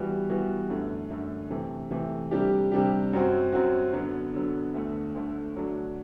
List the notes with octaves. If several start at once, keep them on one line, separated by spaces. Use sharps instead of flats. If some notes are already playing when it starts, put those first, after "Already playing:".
Already playing: E3 G3 B3 F#4
E3 G3 B3 F#4
F#2 D3 A3
F#2 D3 A3
C3 E3 A3
C3 E3 A3
C3 G3 D4 G4
C3 G3 D4 G4
F#2 F#3 C4 F#4
F#2 F#3 C4 F#4
D3 F#3 B3
D3 F#3 B3
D2 D3 A3
D2 D3 A3
D3 F#3 A3 D4